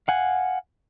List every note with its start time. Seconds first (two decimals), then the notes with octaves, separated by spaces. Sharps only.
0.08 F5 F#5 G#5